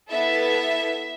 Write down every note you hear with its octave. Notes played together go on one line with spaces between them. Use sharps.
B3 E4 A4 E5